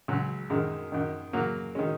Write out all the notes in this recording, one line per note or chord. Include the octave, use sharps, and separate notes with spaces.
C#2 C#3 F#3
F#2 D#3 G#3
F#2 D#3
F#2 C#3 F#3 A#3
D#3 G#3 C#4